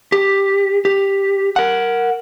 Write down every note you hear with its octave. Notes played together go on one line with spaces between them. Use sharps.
G4
G4
A#4 F#5